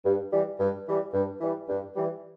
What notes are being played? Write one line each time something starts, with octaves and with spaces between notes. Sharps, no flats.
G2
E3 G3
G2
E3 G3
G2
E3 G3
G2
E3 G3